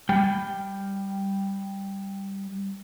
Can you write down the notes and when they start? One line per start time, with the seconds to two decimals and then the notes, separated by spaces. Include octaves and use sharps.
0.09 G3 G5